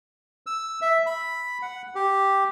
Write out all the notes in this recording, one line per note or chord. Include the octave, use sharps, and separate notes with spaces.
E6
E5
B5
F#5
G4